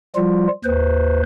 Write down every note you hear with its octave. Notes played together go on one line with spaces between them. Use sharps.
F3 G3 F4
D#2 B4 C5